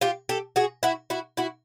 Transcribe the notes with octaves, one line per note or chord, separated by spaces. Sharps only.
F4 G4
G4 A4
F#4 G#4
E4 F#4
E4 F#4
E4 F#4